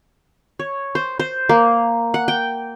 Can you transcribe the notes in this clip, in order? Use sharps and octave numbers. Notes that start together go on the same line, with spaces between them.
C#5
C5
C5
A#3
F#5
G5